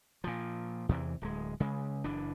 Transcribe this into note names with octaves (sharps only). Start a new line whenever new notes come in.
A#2 F3
E2 C3 E3
D1 G#3
C#3 G#3
F#1 E3 D4